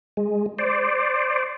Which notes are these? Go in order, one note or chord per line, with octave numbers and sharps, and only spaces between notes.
G#3
C5 D5